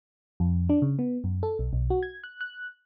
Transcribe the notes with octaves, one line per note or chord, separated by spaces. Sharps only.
F2
D4
C#3
B3
F#2
A4
B1
B1
F#4
G#6
F#6
F#6